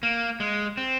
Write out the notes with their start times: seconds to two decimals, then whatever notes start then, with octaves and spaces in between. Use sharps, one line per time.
0.03 A#3
0.40 G#3
0.77 C4